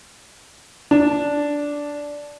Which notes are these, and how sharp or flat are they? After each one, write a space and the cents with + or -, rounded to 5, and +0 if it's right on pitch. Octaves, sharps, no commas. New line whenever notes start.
D4 -10